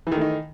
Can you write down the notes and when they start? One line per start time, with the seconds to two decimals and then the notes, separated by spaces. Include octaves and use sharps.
0.07 E3
0.12 D#3
0.16 A3
0.21 D#4